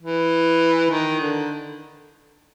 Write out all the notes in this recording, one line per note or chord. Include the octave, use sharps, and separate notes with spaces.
E3
D#3
D3